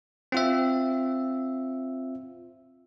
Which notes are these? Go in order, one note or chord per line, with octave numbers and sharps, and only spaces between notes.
C4 F4 E5